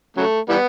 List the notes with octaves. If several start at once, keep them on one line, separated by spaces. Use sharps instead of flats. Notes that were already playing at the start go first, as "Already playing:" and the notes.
C#3 F#3 A3
E3 G3 B3